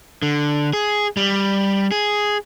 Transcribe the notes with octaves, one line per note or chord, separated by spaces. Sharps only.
D3
G#4
G3
G#4